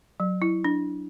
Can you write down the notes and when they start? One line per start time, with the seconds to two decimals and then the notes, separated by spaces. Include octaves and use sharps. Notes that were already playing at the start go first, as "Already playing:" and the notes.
0.20 F#3
0.42 E4
0.64 D4